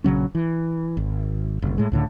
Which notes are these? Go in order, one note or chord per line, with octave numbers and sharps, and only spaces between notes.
A#1 C#3 F#3 C#4
E3
G#1
F#1 C2
A2 G#3
C#2 A2 D3